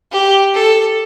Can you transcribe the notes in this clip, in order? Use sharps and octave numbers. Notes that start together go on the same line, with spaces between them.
G4
A4